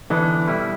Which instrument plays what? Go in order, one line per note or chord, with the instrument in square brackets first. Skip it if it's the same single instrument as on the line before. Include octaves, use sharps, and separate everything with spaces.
[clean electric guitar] D3 B3 D4 [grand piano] E3
[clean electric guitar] B2 G3 E4